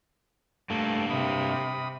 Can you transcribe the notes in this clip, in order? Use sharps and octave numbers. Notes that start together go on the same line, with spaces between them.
G2 A3 A#3
C3 B5 D#6